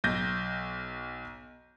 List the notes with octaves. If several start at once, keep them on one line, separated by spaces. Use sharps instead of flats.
B1 G6 A#6